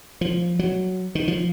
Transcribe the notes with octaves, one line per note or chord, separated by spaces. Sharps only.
F3
F#3
D#3
F3